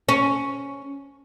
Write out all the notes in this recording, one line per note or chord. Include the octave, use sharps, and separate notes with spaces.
C#4